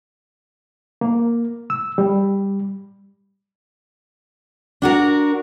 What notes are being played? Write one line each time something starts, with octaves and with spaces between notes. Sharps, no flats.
A#3
E6
G3
D4 F#4 A#4